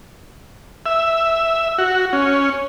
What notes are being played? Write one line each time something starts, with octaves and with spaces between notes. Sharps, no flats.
E5
F#4
C#4